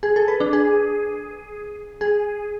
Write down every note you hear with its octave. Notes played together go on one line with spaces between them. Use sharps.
G#4
A4
B4
D4
G#4
G#4